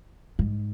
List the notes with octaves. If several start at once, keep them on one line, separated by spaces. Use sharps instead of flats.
G#2